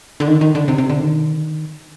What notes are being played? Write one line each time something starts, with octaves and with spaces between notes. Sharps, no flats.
D3
D#3
D#3
D3
C3
C3
D3
D#3